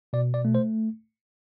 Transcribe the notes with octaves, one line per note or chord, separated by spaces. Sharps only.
B2 D5
D5
A3
C5